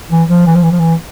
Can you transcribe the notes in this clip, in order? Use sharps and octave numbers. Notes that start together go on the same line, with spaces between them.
E3
F3
E3
F3
E3
F3
E3